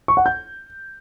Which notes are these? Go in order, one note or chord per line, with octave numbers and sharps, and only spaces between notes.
C#6
F#5
G6